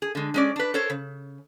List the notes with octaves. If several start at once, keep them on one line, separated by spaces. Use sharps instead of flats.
G#4
D3 G#3
G#3 C#4 D5
D4 B4
A4 A#4 C5 C#5
C#3